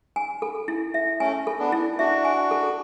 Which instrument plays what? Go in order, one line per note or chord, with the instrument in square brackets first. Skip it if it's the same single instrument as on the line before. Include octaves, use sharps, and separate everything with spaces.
[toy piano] G#5
A4
E4
E5
[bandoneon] A3 C#4 [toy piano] G#5
[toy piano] A4
[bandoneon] B3 D4
[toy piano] E4
[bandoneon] D4 F#4 [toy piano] E5
[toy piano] G#5
A4